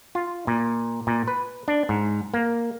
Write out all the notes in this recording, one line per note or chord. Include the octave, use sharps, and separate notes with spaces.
F4
A#2
A#2
B4
D4
G#2
A#3